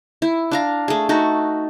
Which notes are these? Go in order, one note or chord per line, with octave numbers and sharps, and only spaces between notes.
E4
D4 F5 A#5
A3 G#4
A3 D#4 F#4